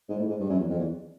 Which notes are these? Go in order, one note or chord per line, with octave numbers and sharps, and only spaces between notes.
G#2
A2
G#2
G2
F#2
E2
F2
E2